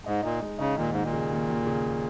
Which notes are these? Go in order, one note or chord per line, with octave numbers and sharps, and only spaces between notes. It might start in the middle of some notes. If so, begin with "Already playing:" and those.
G#2 D#4
A#2 D#4
G#3
C#3 D#4
D#2 A#2
G#2 D#4
A#2
C#3
D#2
D#2
C#3